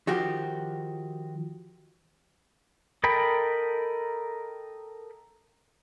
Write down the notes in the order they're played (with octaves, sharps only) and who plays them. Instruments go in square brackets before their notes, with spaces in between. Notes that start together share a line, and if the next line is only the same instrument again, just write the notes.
[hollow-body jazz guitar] D#3 F3 F#4 G4
[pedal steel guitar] A4 A#4 D#5 G5 B5